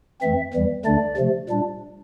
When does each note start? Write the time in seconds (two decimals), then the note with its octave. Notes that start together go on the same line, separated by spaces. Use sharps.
0.21 F2 E3 A3 C4 E5
0.53 E2 E3 G3
0.85 D2 D3 A3 D4 D5
1.17 C3 F3 A3
1.49 A#2 G3 D4